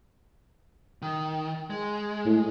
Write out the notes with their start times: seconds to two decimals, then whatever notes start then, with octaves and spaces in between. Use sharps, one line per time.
1.02 D#3
1.70 G#3
2.25 A2